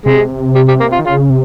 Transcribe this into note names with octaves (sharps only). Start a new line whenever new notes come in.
C3 G#3
G3
G3
A#3
F4
D#3
C#3 F4
C3